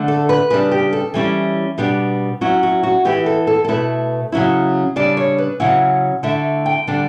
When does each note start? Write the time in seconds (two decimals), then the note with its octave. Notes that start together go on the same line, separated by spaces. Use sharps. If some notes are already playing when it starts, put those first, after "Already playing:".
Already playing: D3 A3 D4
0.08 A4
0.29 B4
0.50 C#3 G3 D4 B4
0.72 G4
0.93 A4
1.14 E3 G3 C#4 E4
1.78 B2 G3 B3 D4
2.41 F#3 C#4 E4 F#4
2.63 F#4
2.83 F#4
3.05 E3 B3 E4 G4
3.26 A4
3.47 A4
3.65 A4
3.68 B2 A3 E4 B4
4.32 C#3 F#3 C#4 E4
4.96 C#3 G3 D4 D5
5.17 C#5
5.38 B4
5.60 C#3 F#3 C#4 E4 F#5
6.23 D3 A3 E4 E5
6.66 G5
6.87 D3 G3 D4